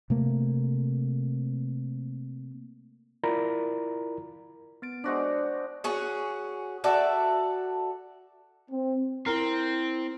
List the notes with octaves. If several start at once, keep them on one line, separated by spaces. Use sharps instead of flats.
C3 A3 A#3
E4 F4 A#4 D5 A#5 B5
B3 A6 D7
G#3 D4 F#4 C5 D5
C#4 F#4 G#4
F#4 A4 D5 E5
C4
C4 E4 A#4